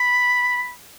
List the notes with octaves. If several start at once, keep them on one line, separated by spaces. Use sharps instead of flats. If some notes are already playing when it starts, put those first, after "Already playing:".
Already playing: B5